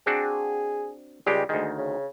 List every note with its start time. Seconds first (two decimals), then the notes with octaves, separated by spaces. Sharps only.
0.06 C4 D4 F#4 G#4
1.26 C#2 G3 G#3 G4
1.49 D2 D#3 G#3
1.78 C#3